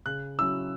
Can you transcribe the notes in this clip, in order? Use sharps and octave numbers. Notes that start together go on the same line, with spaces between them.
C#3 F#6
F#3 C#4 E4 E6